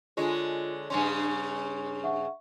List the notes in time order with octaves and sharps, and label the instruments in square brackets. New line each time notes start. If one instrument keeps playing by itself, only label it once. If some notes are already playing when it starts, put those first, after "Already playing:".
[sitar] D3 G#3 C#5 [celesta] F4
[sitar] G2 C#3 C#4 [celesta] C6
[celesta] E5 F#5 C#6